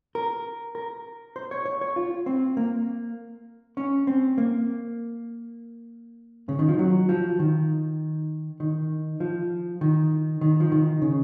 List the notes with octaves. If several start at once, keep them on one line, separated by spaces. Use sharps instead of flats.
A#4
A#4
C5
C#5
C#5
C#5
F4
C4
A#3
C#4
C4
A#3
C#3
D#3
F3
F#3
F3
D#3
D#3
F3
D#3
D#3
F3
D#3
C#3